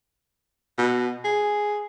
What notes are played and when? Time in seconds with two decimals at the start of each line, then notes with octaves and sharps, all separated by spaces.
0.78 B2
1.24 G#4